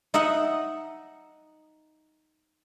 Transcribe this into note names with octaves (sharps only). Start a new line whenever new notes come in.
D#4 D#5 E5 F#5